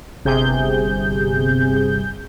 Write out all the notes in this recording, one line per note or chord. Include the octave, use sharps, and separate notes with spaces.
G1 C3 G#4 G6